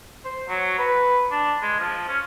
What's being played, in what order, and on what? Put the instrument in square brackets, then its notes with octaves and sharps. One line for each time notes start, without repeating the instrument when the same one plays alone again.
[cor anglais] C5
F#3
B4
D4
G#3
F3
C#4